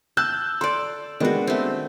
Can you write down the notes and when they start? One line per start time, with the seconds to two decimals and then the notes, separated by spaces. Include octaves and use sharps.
0.17 A5 E6 F#6 G6
0.61 A4 D5 C6
1.20 D#3 G#3 B3 D4 F#4
1.47 A3 C4